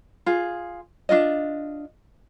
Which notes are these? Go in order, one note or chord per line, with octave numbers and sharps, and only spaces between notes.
F4 G#4
D4 D#4 F4 D#5